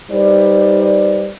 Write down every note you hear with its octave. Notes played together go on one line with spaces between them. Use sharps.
G3 D#4 B4 C5 D5